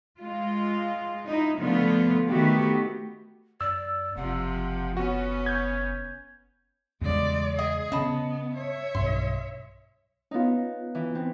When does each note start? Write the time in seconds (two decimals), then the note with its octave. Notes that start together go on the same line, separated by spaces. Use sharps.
0.20 G#3 F4
1.27 D#4 E4
1.60 D3 F3 A3 B3 F4
2.28 D#3 A3 B3 F#4 G4
3.61 F#2 D5 E6
4.17 F#1 C3 F3 F#5
4.97 B3 C#4 F#4
5.46 G6 G#6
7.01 E2 C#3 G3 G#3 D5
7.59 G#4 D#5
7.92 C#3 B3 C#4 D#5 A5 B5
8.55 C#5 E5
8.95 B1 G2 C6
10.31 B3 C#4 D#4 F4
10.95 E3
11.15 B3 C4